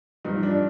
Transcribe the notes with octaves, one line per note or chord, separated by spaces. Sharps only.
G2 F3 D#4
D4